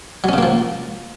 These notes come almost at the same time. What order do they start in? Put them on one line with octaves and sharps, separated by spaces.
F#3 C#4 C#3 A#3 F3